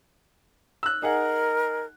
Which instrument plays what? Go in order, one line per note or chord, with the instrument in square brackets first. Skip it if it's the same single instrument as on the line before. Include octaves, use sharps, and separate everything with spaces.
[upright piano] E6 F#6
[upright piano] D#4 G#4 F#5 [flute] A#4